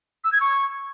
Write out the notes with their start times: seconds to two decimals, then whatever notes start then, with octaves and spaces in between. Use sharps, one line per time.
0.24 E6
0.32 G#6
0.41 C#6